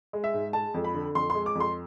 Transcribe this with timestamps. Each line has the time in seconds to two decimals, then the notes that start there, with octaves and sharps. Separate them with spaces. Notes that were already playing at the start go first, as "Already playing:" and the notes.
0.13 G#3
0.24 E5
0.34 G#2
0.53 G#3 A5
0.74 F2
0.84 B5
0.94 D3
1.15 F2 C6
1.30 C6
1.35 G#3
1.46 D6
1.55 F2
1.60 C6